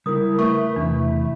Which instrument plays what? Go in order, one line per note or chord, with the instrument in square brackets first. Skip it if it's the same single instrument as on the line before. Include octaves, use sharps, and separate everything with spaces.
[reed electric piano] C#3 A#4 [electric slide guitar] G3 E4 [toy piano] D#6
[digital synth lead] A3 [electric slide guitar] B4 [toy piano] C#6
[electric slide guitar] E2 E4 [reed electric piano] C3 E3 [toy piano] D4